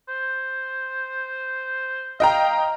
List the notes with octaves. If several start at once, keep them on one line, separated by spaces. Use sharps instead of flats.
C5
D#5 F5 G5 A#5